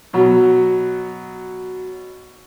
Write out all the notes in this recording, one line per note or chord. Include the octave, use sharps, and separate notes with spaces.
B2 F#3